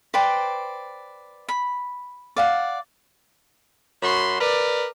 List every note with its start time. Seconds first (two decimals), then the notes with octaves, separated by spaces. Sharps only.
0.14 B4 C5 D5 G5
1.49 B5
2.36 D5 F5 F#5
4.02 F#2 F#4 B5 C6
4.40 A#4 B4 D5